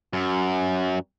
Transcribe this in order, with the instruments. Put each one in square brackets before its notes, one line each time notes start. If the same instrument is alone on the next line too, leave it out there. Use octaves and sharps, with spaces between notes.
[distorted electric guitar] F#2